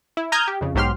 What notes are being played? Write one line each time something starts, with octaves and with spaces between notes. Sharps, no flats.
E4
A#5 D#6 F6 G6 G#6
G4
F2 C#3
B1 G#2 F#3 G4 C6 F6